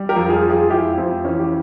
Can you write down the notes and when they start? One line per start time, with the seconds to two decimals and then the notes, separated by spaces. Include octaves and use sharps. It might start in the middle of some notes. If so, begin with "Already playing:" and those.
Already playing: G3
0.09 G4 A#4
0.16 F2
0.29 F4 G#4
0.44 F2
0.50 F4 G#4
0.70 F2 E4 G4
0.98 F2 C4
1.25 E3 C#4
1.39 G4